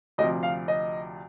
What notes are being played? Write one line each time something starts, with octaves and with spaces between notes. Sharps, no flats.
D2 C3 F3 D#5
F5
D#5